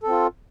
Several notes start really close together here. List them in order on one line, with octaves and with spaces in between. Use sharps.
A4 C4 F4